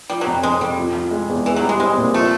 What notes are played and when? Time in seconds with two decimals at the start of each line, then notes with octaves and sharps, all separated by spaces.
0.10 F3 G3
0.21 F#3
0.27 F2
0.43 F2 G#3
0.60 F2 G3
0.78 F3
0.95 F3
1.11 G#3
1.28 E2
1.46 E3 E4
1.56 F#3
1.62 G3
1.69 G#3
1.80 G#3 C4
1.97 A#2
2.14 F3 A3